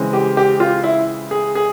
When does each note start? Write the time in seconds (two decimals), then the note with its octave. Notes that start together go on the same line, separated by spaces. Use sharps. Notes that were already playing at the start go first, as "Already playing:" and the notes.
Already playing: C#3 E3 G#3 C4
0.13 G4
0.37 G4
0.60 F4
0.84 E4
1.31 G#4
1.55 G#4